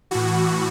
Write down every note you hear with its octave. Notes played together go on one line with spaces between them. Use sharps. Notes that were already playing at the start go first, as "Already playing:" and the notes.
A2 E3 F#4